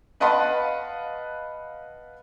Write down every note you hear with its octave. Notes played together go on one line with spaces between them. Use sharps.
B4 D#5 F5 F#5 A5 B5